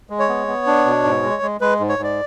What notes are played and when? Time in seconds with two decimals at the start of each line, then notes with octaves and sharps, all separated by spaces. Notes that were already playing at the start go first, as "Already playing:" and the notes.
0.10 G#3
0.19 C#5
0.29 B3
0.47 B3
0.66 D4
0.86 B2
1.04 G#2
1.23 G#3
1.42 G#3
1.61 G#3 B4
1.80 G#2
1.89 C#5
1.99 G#2 D5